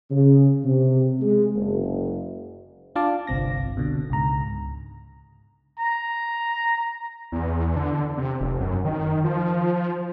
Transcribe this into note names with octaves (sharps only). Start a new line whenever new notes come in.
C#3
C3
G#3
F#1
D4 F4 F5 A5 D6
G1 C2 C4 A#6
B2 D3
C#2 G#2 A#5
A#5
E2
D3
C3
F1
F#2
D#3
F3